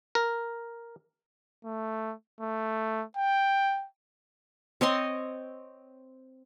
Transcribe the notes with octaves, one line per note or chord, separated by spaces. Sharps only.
A#4
A3
A3
G5
C4 C#5 D#5 C6